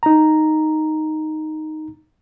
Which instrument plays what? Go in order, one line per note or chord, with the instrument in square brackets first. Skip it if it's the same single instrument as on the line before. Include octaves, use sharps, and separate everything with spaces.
[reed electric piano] D#4 A#5